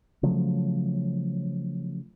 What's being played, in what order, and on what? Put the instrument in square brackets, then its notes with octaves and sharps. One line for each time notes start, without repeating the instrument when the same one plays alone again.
[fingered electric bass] C#3 F3 F#3 A3